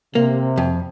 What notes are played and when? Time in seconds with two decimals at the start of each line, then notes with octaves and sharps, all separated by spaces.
0.15 C3 A#3
0.58 F2